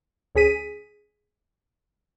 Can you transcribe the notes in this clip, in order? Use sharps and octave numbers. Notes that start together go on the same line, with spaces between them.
D2 C#4 G#4 B6 D#7